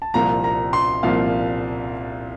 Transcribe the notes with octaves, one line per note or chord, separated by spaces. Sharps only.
A5
C2 A#2 F3 C4 A#5
A#5
C6
C2 A#2 F3 C4 F5